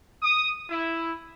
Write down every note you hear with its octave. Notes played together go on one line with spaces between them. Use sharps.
D#6
E4